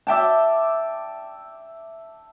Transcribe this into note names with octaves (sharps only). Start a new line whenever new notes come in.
D5 E5 G5 A5